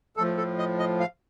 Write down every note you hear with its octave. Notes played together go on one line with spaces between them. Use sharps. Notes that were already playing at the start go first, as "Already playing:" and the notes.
A2 F3 A4
A4
D#5
D#5
F5